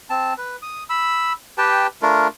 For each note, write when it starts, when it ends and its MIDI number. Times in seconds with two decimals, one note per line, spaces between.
0.10 0.34 60
0.10 0.34 81
0.38 0.56 71
0.62 0.83 87
0.90 1.33 83
0.90 1.33 88
1.58 1.87 67
1.58 1.87 71
1.58 1.87 79
1.58 1.87 81
2.02 2.28 57
2.02 2.28 62
2.02 2.28 65
2.02 2.28 70